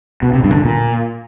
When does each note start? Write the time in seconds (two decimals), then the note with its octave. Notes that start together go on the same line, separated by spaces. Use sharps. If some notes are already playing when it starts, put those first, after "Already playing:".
0.23 B2
0.33 C3
0.44 G2
0.54 D3
0.65 A#2